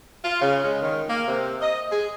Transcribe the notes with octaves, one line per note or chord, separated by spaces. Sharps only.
F4
C#3
G#3
D#3
A#3
C3
D#5
G#4